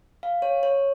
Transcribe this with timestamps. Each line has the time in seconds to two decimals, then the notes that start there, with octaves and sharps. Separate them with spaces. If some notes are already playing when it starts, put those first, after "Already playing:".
0.23 F5
0.42 C#5
0.63 C#5